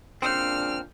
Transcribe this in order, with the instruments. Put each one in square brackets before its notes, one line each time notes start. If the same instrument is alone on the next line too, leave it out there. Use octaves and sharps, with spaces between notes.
[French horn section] A#2 C#3 D4 [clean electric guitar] C4 [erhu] F6 [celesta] G6 C7 C#7